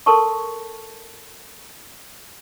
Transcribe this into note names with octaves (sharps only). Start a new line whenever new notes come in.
A4 A#4 A5 C6 C#6